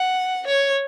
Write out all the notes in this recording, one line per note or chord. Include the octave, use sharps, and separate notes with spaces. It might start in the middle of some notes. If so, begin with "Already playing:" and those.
Already playing: F#5
C#5